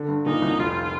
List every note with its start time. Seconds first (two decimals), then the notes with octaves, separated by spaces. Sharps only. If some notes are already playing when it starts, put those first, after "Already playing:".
Already playing: D3
0.08 G2
0.26 A#2 D#4
0.42 C2
0.59 F1 F4